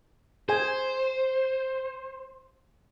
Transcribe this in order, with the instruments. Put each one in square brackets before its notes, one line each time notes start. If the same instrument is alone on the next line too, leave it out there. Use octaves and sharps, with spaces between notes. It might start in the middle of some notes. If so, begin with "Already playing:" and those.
[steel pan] G#4 G#5 [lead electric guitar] C5